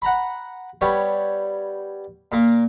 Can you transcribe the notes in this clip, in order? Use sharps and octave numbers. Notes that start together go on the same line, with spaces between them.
F#5 A#5 B5
G3 B3 C#5
A#2 A#3